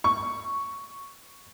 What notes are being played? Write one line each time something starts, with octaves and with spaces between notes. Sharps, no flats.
C#6